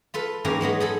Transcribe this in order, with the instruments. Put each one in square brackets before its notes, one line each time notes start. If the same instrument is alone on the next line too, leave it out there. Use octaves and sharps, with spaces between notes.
[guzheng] F4 A4 B4
G#2 E3 A#3 C#4 G4 A#5
F#3 G#3 B3 D#4
D#4 G#4 A4